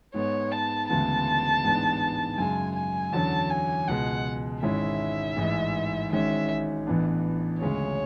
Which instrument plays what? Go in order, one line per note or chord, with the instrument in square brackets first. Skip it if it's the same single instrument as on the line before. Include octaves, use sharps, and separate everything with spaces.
[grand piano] G#2 G#3 B3 [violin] C#5
[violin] A5
[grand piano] D2 C#3 E3 G#3 B3 [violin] A5
[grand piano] A1 G#2 G#3 B3 D4
[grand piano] F#2 C#3 G#3 [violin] G#5
[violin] G#5
[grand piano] E2 D3 F#3 C#4 [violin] A5
[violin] G#5
[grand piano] C#2 B2 G#3 [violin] F#5
[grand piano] G#1 G#2 G#3 C#4 E4 [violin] E5
[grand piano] A1 G#2 E3 G#3
[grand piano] G#1 G#2 G#3 C#4 [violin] E5
[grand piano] A1 A2 E3 B3 D4
[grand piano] D2 C#3 G#3 C#4 G#4 [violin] C#5